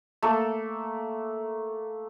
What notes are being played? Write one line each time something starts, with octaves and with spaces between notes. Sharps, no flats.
A3 A#3 A4